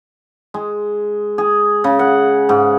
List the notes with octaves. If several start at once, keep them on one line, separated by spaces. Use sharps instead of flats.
G#3
G#4
C#3
F#5
G#2